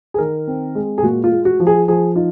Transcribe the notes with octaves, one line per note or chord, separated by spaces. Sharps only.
G#4
D#3 A#4
C4
G#3
G#4
A#2 F#4
F4
G#3
F#4
F3
G#4
F3 G#4
D#4 F4